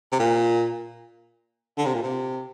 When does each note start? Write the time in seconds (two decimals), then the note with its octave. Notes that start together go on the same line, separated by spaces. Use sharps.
0.12 C3
0.19 A#2
1.78 D3
1.86 C3
1.94 A#2
2.03 C3